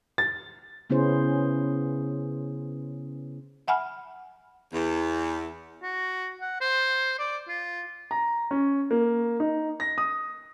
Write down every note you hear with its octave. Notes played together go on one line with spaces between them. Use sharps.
A6
C#3 B3 C#4 E4 G#4 C5
E5 F#5 G#5 B5 F6
E2
F#4
F#5
C5
D5
F4
A#5
C#4
A#3
D#4
A#6
D#6